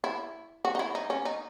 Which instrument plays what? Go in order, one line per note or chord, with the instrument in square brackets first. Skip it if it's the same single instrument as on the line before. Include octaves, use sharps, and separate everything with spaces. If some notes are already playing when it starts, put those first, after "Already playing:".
[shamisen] E4
F#4
D#4
E4
D#4
C#4
D#4